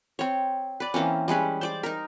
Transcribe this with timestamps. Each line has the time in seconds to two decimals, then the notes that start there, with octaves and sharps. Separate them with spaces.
0.19 C4 C#5
0.80 B4 D5
0.94 E3 A#3 C4 C#4
1.28 G3 G#3 C#4 B4
1.61 C5 D5 D6
1.83 D#4 A#4